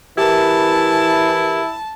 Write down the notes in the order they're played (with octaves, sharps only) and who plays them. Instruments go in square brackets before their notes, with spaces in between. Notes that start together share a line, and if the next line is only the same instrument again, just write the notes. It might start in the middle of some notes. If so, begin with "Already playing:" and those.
[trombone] E3 [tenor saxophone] E4 [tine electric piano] G4 A#4 [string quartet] A5